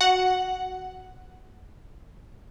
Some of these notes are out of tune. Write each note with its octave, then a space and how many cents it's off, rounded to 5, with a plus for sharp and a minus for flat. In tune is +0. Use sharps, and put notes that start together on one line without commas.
F#4 +0 F#5 +0